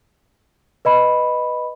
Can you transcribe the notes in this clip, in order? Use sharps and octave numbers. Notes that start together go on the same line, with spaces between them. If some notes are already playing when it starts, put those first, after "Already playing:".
B4 D#5 B5